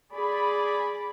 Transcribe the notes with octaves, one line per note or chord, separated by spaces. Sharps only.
G#4 D5 B5